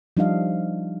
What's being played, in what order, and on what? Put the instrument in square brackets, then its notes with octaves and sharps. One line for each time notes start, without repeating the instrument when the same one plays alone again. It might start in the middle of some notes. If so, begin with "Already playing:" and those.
[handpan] F3 G3 D4 D#4 D#5 F5